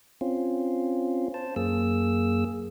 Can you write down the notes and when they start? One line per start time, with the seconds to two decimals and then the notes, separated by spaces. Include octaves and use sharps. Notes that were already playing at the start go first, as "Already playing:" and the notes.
0.21 C4 C#4 F4
1.34 C5 A5
1.56 F#2 A#3 G#4 E6